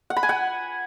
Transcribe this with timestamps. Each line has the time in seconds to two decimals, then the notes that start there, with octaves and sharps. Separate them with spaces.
0.10 F#5
0.17 B5
0.23 G#5
0.29 F#5